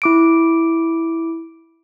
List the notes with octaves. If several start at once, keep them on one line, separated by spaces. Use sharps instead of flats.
E4 D6 D7